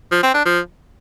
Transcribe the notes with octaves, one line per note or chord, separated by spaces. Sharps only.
F3
C4
D4
F3